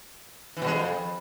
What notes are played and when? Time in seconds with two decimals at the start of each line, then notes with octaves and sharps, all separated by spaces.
0.57 E3
0.62 B2
0.67 G#3
0.72 F2